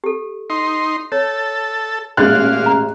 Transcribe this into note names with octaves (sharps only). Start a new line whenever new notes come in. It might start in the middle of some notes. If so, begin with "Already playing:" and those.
G4 A4
D#4 C6
A4 C#5
A1 A#2 G#3 D5 D#5 F5 F#6
A#5